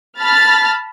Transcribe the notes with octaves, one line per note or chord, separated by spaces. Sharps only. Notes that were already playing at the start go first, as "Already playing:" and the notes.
A5 B5 F6 A6